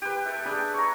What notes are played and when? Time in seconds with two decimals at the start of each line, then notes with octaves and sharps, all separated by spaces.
0.02 G4 B4
0.26 A4 E5
0.45 D4 G#4 B5
0.74 C#5 A#5